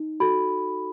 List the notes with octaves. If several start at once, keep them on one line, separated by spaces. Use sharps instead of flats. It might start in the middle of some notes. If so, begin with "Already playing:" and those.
Already playing: D#4
F#4 A4 B5